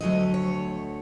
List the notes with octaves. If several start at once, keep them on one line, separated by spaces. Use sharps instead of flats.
D2 D3 F#3 A3 D#5
C#5